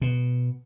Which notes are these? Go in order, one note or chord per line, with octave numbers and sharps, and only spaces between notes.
B2